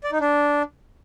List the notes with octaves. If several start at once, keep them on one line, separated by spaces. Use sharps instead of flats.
D5
D#4
D4